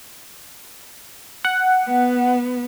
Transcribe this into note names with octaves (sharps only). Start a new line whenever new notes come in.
F#5
B3